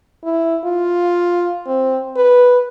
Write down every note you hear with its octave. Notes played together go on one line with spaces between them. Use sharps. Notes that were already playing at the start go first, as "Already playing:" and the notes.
E4
F4
C4
B4